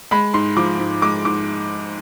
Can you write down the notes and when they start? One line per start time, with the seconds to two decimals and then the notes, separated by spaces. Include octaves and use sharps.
0.11 G#3 B5
0.34 G#2 C6
0.57 F3 D6
0.79 G#2
1.02 G#3 D6
1.25 G#2 D6